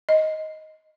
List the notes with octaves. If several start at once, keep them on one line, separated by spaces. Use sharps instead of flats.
D#5